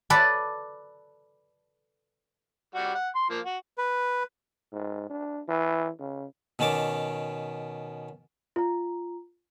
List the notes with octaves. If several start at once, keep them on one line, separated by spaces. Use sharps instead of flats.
A4 B4 D5
G3 F#4
F#5
C6
F3 A#3
F#4
B4
G#2
D4
E3
C#3
B2 D#3 C#4 A5 D6
F4 A#5